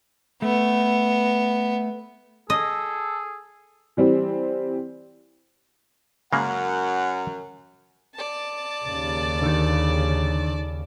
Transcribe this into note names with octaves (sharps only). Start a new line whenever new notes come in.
A3 B3
G#4 A4 D#5
E3 G3 C4
F#2 C#3 G#3 A#3 F#5
D5 A5
D#2 C#3
D3 D#3